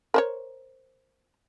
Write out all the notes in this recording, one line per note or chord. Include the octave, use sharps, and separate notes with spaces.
A#4 C5 C#5